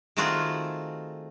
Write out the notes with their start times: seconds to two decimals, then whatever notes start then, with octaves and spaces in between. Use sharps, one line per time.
0.17 D#3 A3 C4 F4 F#4 G#4